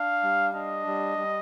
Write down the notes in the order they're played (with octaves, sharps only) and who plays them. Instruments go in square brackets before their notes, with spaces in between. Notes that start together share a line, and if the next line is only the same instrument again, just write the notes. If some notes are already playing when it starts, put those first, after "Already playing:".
Already playing: [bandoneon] D4 [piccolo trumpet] F5
[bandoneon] G3
[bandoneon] D4 [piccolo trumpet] D#5
[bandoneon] G3
G3